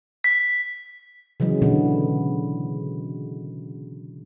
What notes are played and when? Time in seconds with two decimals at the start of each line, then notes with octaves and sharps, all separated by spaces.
0.24 B6
1.40 C#3 E3 F#3 G#3
1.62 B2 D3 E3 B3